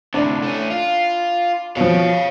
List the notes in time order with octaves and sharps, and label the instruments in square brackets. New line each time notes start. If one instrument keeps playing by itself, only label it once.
[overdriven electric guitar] D2 C3 [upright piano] D4 E4
[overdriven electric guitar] A3 C#4
F4
[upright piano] B2 F3 [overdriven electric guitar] C#5 F5